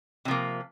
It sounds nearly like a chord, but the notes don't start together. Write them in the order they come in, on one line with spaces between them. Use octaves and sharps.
C3 F3 A#3